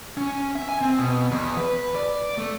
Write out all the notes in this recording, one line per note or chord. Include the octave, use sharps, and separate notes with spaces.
C#4
E5
G#5
C4
B2
E2
B4
D5
A3